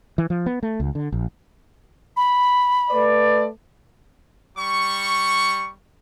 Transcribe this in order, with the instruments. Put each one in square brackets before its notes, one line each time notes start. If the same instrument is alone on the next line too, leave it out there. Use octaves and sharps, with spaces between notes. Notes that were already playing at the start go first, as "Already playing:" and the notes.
[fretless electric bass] E3
F3
B3
A3
C#2
D3
A#1
[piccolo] B5
[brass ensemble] A3 B4 D5
[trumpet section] G3 C#6